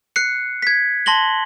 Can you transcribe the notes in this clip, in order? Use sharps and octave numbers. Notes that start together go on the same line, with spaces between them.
F#6 C7 C#7
G#6 B6
A5 C6 A#6 F#7 G7